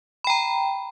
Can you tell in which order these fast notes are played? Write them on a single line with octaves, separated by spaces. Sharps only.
B5 G5 A#5